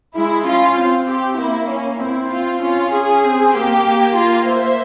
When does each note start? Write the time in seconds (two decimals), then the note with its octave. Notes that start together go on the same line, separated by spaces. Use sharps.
0.15 G#3 E4
0.46 C#4 F4
0.77 C4
1.08 G4
1.38 A#3 E4
1.70 C#4
2.00 C4 E4
2.31 F4
2.62 C#4 F4
2.93 G#4
3.24 C4
3.54 A#3 G4
3.85 A#3
4.17 F4
4.46 C5 E5